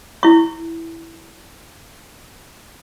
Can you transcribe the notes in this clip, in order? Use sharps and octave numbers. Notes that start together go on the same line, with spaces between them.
E4 C#6